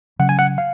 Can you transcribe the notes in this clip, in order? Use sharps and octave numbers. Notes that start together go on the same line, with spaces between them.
C#3 F#3 C#4 F#5
G#5
F#5
F5